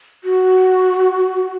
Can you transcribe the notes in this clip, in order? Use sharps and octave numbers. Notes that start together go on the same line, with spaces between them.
F#4